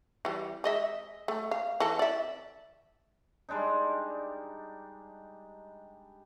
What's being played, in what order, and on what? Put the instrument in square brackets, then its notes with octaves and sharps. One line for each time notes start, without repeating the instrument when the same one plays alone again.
[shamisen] E3 G3
G#3 D#5 E5
A3
F5
E3 A4
D5 E5
[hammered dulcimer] G3 G#3 D4 D#4